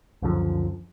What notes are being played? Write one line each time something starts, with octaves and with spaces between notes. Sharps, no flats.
C#2 F#2 D3 F3